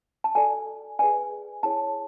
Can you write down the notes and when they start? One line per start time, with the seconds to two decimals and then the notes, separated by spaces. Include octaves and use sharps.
0.24 A5
0.35 F#4 A4 D5 G#5
0.99 G#4 B4 D5 G#5
1.63 E4 G#4 C#5 A5